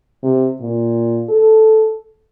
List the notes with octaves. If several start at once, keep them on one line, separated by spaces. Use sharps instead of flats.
C3
A#2
A4